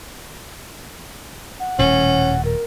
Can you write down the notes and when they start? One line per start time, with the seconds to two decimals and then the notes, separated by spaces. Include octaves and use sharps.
1.60 F#5
1.79 D#1 A2 C#4
2.45 A#4